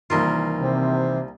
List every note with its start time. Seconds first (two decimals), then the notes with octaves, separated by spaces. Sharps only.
0.10 C2 D#3 E3 A#3 F4 A#4
0.60 C3